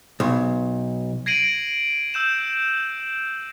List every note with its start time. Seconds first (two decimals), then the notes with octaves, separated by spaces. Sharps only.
0.20 B1
1.26 G#6 A#6 C7 D7 D#7 F#7
2.14 E6 G6 E7